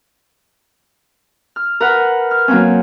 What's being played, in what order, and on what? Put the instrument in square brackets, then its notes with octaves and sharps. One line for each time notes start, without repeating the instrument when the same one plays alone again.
[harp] F6
A#4 B4 F#5
F6
F#3 A#3 C4 C#4